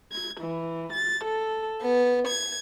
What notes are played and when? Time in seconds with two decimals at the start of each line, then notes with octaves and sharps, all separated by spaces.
0.12 G#6
0.40 E3
0.93 A6
1.24 A4
1.82 B3
2.26 G#6